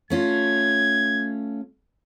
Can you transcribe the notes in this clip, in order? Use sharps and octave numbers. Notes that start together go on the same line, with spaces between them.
A3 C#4 F4 G#6